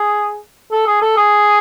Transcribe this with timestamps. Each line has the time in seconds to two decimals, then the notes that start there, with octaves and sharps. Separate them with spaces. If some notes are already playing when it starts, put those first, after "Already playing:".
Already playing: G#4
0.72 A4
0.87 G#4
1.02 A4
1.17 G#4